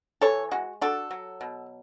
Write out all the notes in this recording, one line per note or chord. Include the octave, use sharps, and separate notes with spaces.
E3 A4 C#5
G#3 F#4
D4 F#4 A4
F#3
B2